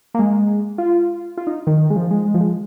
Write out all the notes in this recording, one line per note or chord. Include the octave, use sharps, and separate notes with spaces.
A#3
G#3
F4
F4
D#4
D#3
G#3
F3
G#3
G#3
F3
G#3